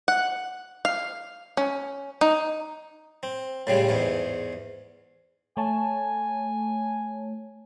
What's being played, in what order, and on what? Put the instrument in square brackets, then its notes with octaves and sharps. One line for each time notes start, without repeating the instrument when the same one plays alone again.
[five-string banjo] F#5
F5
C#4
D#4
[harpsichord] C4
A2 C#3 G3 G#3
E2 G#2 E3
[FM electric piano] A3 C#5 A5 [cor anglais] G#5